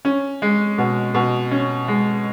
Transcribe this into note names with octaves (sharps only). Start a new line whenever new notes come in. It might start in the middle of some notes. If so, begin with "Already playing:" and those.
C#4
G#3
B2
B2
C#4
G#3